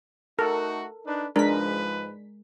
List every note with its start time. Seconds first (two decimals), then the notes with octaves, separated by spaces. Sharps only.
0.39 A3 D#4 F#4 A4 A#4
1.06 D4 D#4 B4
1.36 G#2 F3 G#3 D4 A#4 B4 B6